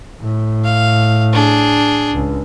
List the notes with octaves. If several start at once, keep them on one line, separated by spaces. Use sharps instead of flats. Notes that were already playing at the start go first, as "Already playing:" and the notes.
A2
F5
D4 G#4
C#2